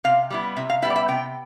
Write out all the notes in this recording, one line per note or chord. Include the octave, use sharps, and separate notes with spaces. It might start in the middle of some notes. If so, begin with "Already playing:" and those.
C3 F5
G3 B3 E4
C3 E5
F5
G3 B3 E4 E5
D5
E5
C3 G5